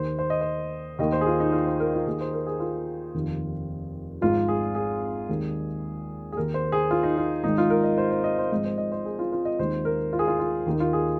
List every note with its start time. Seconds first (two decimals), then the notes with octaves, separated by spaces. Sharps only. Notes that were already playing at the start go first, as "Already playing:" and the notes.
Already playing: D#2 D#3 A#3 D#4 C5
0.19 C5
0.30 D#5
0.41 C5
0.99 D#2 D#3 A#3 D#5
1.12 C5
1.21 G#4
1.26 F4
1.40 D#4
1.52 F4
1.66 C5
1.80 A#4
1.94 F4
2.06 D#2 D#3 A#3 D#4 G#4
2.21 C5
2.33 A#4
2.47 G#4
2.60 F4
3.14 F1 D#2 D#3
4.21 G#1 G#2 F3 F4
4.48 G#4
4.75 G#4
5.29 D#2 D#3 G#3 D#4
6.32 G#4
6.36 D#2 D#3 A#3 A#4
6.54 C5
6.72 G#4
6.91 F4
7.03 D#4
7.17 F4
7.44 G#1 G#2 D#3 G#3 D#4
7.58 F4
7.70 A#4
7.84 D#5
7.98 C5
8.11 C5
8.24 D#5
8.38 C5
8.52 G#1 G#2 F3 G#3 D#5
8.65 C5
8.78 D#5
8.92 C5
9.05 G#4
9.19 F4
9.32 F4
9.45 D#5
9.59 D#2 D#3 G#3 D#4 C5
9.85 A#4
10.13 F4
10.19 G#4
10.28 F4
10.39 F4
10.66 D#2 D#3 A#3 D#4
10.80 F4
10.93 G#4